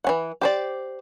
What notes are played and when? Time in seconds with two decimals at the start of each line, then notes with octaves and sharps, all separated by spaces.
0.04 E3 C#4 F#5
0.41 G4 C5 D5